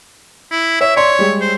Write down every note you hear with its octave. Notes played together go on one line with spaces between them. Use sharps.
E4
C#5 E5
C#5 D5 C6
G3 G#3
C5